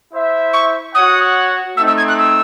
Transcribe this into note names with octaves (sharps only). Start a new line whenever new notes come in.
E4 C5 E5
C#6
F#4 C#5 F#5 D#6
A3 C4 D#4 E6
E6
G#6
F#6
E6